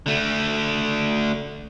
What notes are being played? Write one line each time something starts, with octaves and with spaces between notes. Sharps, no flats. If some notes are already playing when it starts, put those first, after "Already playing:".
D3 A3